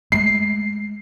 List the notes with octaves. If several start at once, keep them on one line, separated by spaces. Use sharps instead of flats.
G#3 A3 C7